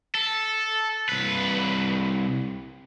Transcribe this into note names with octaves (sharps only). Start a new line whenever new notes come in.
A4
C2 B4